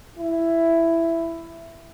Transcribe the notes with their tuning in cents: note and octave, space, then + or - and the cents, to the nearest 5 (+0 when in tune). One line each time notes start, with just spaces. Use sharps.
E4 +10